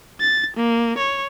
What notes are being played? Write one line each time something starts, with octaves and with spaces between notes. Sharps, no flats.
A6
A#3
C#5